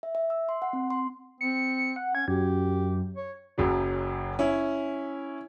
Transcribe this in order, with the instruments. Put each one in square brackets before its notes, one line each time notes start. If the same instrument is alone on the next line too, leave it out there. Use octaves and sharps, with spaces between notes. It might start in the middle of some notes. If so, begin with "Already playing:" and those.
[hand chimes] E5
E5
E6
C6
F#5
C4
C6
[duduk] C4 [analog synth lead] C#7
[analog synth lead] F#5
[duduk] C#4 [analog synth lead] G#6
[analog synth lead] F#2 [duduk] G4
[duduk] C#5
[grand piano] F#1 F#2 C#3 F#3
C#4 E4